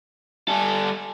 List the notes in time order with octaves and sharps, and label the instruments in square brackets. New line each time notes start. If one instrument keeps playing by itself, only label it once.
[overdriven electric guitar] G3 A4 [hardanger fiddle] G#5